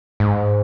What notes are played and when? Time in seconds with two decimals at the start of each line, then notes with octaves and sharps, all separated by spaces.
0.20 G#2